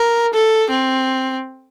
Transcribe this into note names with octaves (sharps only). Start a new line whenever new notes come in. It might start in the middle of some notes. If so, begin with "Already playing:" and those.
Already playing: A#4
A4
C4